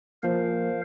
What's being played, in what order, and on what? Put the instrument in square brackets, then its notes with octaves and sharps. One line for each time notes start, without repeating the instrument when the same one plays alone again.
[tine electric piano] F3 A#3 [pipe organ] A#4 C5 F5